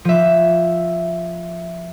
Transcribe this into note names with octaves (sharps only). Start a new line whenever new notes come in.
F3 E5